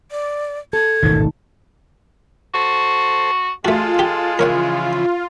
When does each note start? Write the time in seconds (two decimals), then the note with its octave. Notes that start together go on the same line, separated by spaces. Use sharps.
0.11 D5
0.73 A4 G#6
1.03 E1 A1 G#2 D#3
2.54 F#4 A4 C5
3.65 G#3 A3 F4 F#4 A4
3.99 G4
4.39 C#3 E3 F3 A#4 C#5 F#5